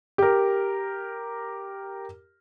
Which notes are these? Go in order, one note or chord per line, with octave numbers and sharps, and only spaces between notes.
G4 A#4